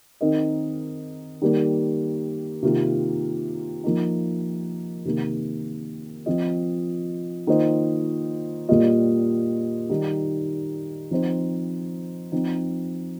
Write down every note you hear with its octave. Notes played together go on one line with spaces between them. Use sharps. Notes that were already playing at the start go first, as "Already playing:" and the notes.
D#3 C4 D#4 A#4 D#5
D#3 G3 A#3
C3 D#3 A#3 F4
F3 A#3 D#4
C3 D#3 A#3
F3 C4 F4 D#5
D#3 A#3 F4 C5 D#5
A#2 G3 A#3 F4 D#5
D#3 G3 D#4
F3 C4 D#4 C5
F3 C4 D#4